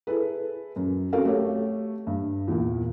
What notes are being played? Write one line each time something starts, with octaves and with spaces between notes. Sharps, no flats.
E4 G#4 A4 B4
F#2
C4 C#4 F#4 A4 A#4 F5
A3 G4 C#5
G2
E2 A#2